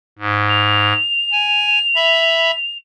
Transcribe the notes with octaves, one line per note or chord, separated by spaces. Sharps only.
G#2
F7
G#5
E5 B5